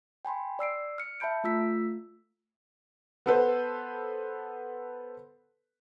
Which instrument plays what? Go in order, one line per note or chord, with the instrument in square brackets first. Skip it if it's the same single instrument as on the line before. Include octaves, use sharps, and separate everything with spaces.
[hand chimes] G5 G#5 B5 C6
D5 E6 C7 D7
F6 C#7
E5 A5 B5 G6 D7
A3 F4 E6 B6
[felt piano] B3 A4 B4 C5